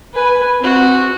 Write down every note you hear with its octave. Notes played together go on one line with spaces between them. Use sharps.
B4 G#5
C4 F#4